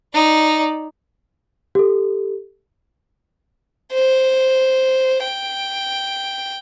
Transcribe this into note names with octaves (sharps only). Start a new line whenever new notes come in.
D#4 D5
G4 A4
C5
G5